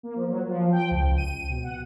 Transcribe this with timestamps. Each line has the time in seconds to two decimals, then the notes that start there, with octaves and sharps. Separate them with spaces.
0.03 A#3
0.16 F3
0.28 F#3
0.47 F3
0.72 G5
0.91 C#2
1.17 D#7
1.49 B2
1.64 F#5